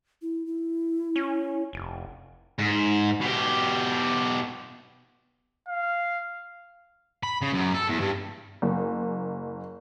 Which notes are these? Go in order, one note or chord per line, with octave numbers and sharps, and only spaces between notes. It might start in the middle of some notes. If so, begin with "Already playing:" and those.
E4
E4
C#4
F1
G#2
B2 G4
F5
B5
C#3
F#2
A4
E2
G2
F#1